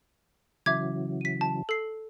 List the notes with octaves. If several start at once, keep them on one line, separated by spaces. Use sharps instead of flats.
C#3 E3 F#3 E5 D6 G#6
B6 D#7
A5
A4 C7